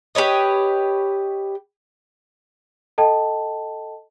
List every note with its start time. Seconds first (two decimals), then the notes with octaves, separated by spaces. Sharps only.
0.15 G4 B4 C#5 D#5
2.98 A4 D#5 G5 A5